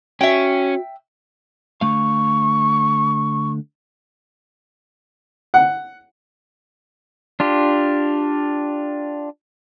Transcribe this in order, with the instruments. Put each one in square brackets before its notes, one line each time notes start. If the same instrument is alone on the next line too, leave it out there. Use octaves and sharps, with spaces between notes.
[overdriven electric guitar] C#4 [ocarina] F#4 [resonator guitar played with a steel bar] E5 G5
[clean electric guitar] D3 A3 F5 [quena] C#6
[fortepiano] F#5
[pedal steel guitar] D4 F4 G4